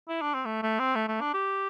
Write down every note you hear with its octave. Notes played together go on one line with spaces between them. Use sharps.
E4
D4
C4
A3
A3
C4
A3
A3
D4
G4